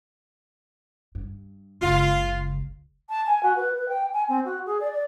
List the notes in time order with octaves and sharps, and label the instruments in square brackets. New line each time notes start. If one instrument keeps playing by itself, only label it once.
[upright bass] G2
[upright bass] F#1 C#2 [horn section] F4
[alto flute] A5
G#5
F#4
B4
B4
G5
G#5
C4
F#4
G#4
D5
D5